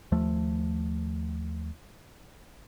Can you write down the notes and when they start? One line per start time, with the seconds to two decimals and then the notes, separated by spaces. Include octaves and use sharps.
0.12 D#2 F3 A3